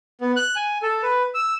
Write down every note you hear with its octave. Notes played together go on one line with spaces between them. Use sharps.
B3
F#6
G#5
A4
B4
E6